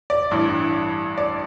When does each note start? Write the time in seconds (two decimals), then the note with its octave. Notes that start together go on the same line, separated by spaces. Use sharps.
0.10 D5
0.31 A1 G2 E3
1.18 D5